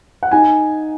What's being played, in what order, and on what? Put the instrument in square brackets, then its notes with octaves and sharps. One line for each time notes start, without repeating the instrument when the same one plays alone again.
[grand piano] F#5
D#4 G#5